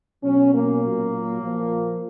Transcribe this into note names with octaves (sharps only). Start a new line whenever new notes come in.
B2 F#3 C#4
A#3
A#2 F#3
A#2 F3